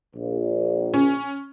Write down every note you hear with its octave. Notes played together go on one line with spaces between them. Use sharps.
A#1
C#4